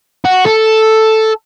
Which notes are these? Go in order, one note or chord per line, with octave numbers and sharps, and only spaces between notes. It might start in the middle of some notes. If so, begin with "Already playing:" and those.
F#4
A4